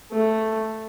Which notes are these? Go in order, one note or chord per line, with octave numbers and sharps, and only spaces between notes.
A3